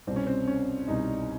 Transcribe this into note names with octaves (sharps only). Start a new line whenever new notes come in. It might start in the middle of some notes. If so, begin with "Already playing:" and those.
C2 B2 G3 C4
C#4
C4
C#4
C2 B2 G3 D#4